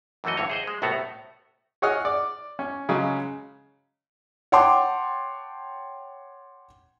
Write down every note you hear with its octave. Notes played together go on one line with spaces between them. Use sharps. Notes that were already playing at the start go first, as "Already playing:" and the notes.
F#2 E3 F3 A3 F#4 D#5
D2 G2 D3 E3 C#5
G#4 C5 D#5
G#3
C2 A2 A3 B3 F#4 A#5
G#4 C#5 D#5 F#5 D#6 F6
D5
C#4
C#3 F#3 G#3 C#4
C#5 F#5 G5 A5 C6 D6